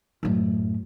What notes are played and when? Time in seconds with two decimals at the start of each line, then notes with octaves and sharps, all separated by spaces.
0.23 F#2 A2